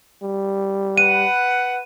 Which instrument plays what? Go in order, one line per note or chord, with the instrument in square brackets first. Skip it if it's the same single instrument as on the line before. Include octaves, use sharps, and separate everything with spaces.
[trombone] G3
[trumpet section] B4 F#5 [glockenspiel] D#7